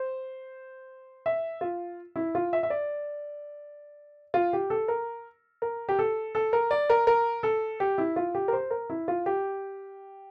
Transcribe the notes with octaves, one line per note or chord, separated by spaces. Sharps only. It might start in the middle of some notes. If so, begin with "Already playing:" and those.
Already playing: C5
E5
F4
E4
F4
E5
E5
D5
F4
G4
A4
A#4
A#4
G4
A4
A4
A#4
D5
A#4
A#4
A4
G4
E4
F4
G4
A#4
C5
A#4
E4
F4
G4